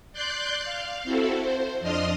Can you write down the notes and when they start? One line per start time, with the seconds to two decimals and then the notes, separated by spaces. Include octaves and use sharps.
0.13 D5 C6 F#6 G6
0.63 F5
1.04 C4 E4 F#4 A4
1.41 C5
1.80 F2 D4 D#5 C6 D#6 F6